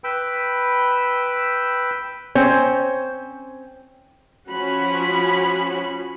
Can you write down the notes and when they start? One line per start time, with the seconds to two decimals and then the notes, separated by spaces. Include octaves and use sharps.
0.04 B4 G5 B5 E6
2.35 C4 C#4 C5 C#5
4.50 F3 C#4 F#4 B5